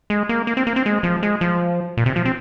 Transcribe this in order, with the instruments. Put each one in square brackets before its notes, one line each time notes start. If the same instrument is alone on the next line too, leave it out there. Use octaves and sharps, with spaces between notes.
[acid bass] G#3
A#3
A#3
C4
A#3
C4
G#3
F3
G#3
F3
A#2
C3
F3
C4